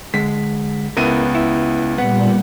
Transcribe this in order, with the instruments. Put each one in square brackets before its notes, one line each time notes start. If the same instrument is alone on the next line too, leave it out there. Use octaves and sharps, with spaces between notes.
[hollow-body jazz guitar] D3 G#3 [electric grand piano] B6
[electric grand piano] C#2 B3 D#7 [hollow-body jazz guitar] E4 A#4
[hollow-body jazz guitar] E4
[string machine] A#2 G3 [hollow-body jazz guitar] B3 [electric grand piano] F#5